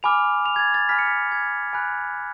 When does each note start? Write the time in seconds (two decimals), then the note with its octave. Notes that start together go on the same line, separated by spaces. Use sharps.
0.03 G#5 B5 D6 F6 F7
0.46 F7
0.56 G#6
0.59 A6
0.74 A6
0.89 G#5 B5 F6 B6
0.99 C#7
1.07 B6
1.32 G#6
1.73 G#5 B5 F#6